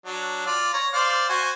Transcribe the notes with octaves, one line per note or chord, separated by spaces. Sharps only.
F#3 D4
F4 D5
C#5 A#5
C5 D5 F5
F#4 C5 G#5